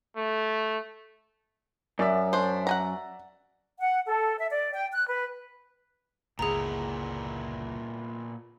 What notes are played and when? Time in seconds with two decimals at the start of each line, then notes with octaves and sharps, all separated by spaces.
0.16 A3
1.99 F#2 D5 E5
2.33 D4 C5
2.67 F#5 G#5 A#5
3.79 F#5
4.06 A4
4.37 E5
4.50 D5
4.73 G5
4.91 F#6
5.07 B4
6.39 G1 C#2 A#2 B3 E4 G#4 A#5